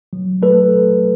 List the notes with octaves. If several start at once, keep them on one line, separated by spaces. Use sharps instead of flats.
F#3
A3 A4 B4